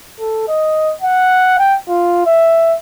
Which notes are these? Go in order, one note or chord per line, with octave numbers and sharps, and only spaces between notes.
A4
D#5
F#5
G5
F4
E5